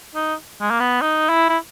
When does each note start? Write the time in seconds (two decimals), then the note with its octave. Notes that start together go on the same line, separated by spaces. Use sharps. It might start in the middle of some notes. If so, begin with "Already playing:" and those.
0.15 D#4
0.61 G#3
0.71 A#3
0.80 B3
1.02 D#4
1.29 E4
1.49 E4